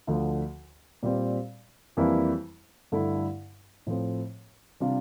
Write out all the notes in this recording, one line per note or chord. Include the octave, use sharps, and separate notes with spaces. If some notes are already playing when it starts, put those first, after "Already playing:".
D2 D3 F3
A#2 G3 C4
F2 E3 G3 A#3 E4
G2 D3 A3 E4
A2 F3 A3 C4
C3 G3 D4 F4